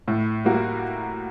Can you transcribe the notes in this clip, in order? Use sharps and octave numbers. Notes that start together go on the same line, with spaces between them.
A2
G3 A#3 F#4